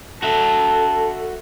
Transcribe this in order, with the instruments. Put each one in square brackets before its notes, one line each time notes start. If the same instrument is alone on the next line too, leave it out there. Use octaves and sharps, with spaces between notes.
[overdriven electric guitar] F#4 E5 [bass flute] A4 [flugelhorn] A5